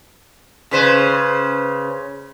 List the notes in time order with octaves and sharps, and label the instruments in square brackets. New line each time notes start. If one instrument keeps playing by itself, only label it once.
[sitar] C#3 B4 C5